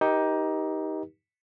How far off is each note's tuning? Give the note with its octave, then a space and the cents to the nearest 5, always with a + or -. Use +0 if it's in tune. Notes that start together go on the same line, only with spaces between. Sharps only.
D#4 +15 G4 +0 A#4 +45